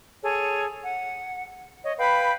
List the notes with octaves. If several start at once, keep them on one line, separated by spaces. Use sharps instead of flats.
G#4 A4 C#5
F#5
C#5 D#5
B4 F5 G5 B5